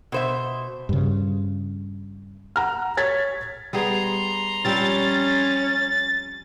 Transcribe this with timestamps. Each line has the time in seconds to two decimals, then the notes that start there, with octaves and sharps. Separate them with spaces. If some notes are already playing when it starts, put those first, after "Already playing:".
0.12 B2 C5 E5
0.89 G2 C#3
2.56 F#5 A#5 F6
2.97 C#5 G#6 A6 B6
3.73 G3 B3 G#4 A#5 C6
4.65 F3 G3 C4 C#4 A6